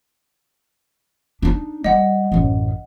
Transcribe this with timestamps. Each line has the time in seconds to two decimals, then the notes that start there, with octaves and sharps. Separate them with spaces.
1.42 D4 D#4
1.84 G3 D#5 F#5
2.32 A1 F#2